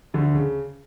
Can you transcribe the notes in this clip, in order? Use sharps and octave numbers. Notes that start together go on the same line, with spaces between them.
D2 D3
C#3